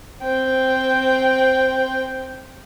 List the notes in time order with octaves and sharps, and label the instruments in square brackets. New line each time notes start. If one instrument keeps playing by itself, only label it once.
[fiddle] C4 G5